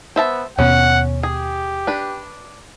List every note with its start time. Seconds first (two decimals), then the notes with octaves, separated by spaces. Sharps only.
0.16 B3 C5 E5 A5
0.59 D#2 B2 B3 C#4 F#5
1.23 G4 G#4
1.87 D4 B4